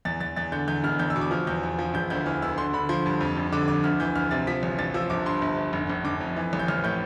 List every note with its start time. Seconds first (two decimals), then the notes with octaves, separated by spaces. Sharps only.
0.05 E2 A6
0.21 E2 A6
0.36 E2 A6
0.52 D3 G6
0.68 E2 G6
0.84 E1 F6
0.99 E2 G6
1.10 E6
1.16 B2
1.21 D6
1.31 F3 F6
1.47 E2 G6
1.63 E2
1.79 F3
1.94 E1 G6
2.10 D2 G6
2.26 E3 F6
2.42 D2 E6
2.58 D3 C6
2.73 D3 B5
2.89 F3 C6
3.06 G2
3.21 F2
3.37 F1
3.52 D3 D6
3.68 F2 D6
3.84 D2 F6
4.00 E3 G6
4.15 D2 F6
4.31 C3 A6
4.47 F3 B6
4.63 A1
4.79 A1 A6
4.94 F3 E6
5.10 G1 D6
5.26 G2 C6
5.42 G1
5.58 G1
5.73 F1
5.90 F1
6.05 F1 D6
6.20 F2
6.36 E3
6.53 A1
6.59 G6
6.68 A1 F6
6.84 A2 G6